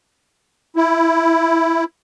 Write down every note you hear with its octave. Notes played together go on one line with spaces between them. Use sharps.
E4